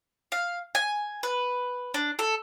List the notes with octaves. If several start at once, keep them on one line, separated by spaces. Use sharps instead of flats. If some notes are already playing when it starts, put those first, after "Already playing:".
F5
G#5
B4
D4
A4